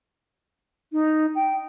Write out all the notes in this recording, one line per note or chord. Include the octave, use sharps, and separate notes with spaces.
D#4
G5